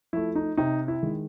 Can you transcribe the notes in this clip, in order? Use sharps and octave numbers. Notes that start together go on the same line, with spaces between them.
F3 A3 E4
D#4
C3 D#4
E4
D#3 G#3